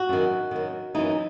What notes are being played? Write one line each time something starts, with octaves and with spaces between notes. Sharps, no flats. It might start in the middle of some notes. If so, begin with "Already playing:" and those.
Already playing: F#4
F#2 D#3
F#2 D#3
F#2 E3 D#4